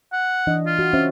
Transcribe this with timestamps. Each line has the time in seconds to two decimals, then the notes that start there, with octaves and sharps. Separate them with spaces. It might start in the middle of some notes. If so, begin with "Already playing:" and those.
0.13 F#5
0.47 E3 D4 D#5
0.66 F4
0.79 F#4
0.93 C#4 C5 E5